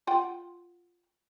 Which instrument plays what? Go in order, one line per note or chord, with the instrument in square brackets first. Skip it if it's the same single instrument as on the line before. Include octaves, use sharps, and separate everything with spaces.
[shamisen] F4 F#5 G5